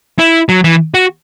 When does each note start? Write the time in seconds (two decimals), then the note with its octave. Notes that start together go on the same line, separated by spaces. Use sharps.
0.19 E4
0.49 F#3
0.64 E3
0.94 F#4